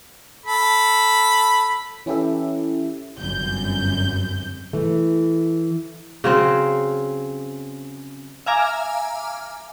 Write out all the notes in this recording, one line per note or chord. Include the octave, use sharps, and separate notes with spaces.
A4 B5
E3 C#4 E4 G4 A4 E5
G1 C2 F#2 G6
E3 A3
C#3 F#3 C4
E5 F5 G#5 A#5 D6 F6